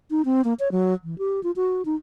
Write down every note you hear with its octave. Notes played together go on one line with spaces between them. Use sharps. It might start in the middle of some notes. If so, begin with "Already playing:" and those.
D#4
C4
A#3
C#5
F#3
E3
G4
F4
F#4
D#4